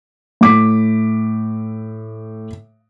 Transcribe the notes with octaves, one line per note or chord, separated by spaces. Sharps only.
A2 D6 B6